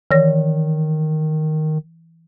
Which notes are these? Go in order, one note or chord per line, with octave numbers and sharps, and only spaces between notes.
D#3 E3 C#5 A#6